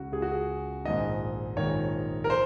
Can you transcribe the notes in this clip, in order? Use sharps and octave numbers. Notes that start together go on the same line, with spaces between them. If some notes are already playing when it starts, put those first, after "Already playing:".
Already playing: C#2 C#3 F#4
C#2 C#3 G#4
F#4
G#4
A#1 G#2 D#3 D#5
A#1 G#2 D#3 C#5
A#4
C5